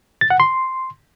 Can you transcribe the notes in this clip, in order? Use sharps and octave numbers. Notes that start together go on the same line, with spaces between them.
A6
F#5
C6